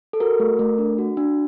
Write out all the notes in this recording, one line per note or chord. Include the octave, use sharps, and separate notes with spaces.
A4
F#4 A#4
A3
A3
D4
F#4
D4